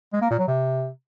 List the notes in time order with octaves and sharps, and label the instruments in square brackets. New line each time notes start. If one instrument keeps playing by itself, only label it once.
[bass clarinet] G#3
A#3
A#2
F#3
C3